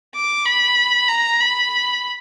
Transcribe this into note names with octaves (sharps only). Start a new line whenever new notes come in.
D6
B5
A#5
B5